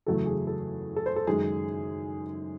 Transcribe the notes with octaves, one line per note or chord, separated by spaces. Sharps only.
F#1 E2 C#3 F#3 A3 A4
G#4
A4
A4
C5
A4
F#2 D#3 G#3 G#4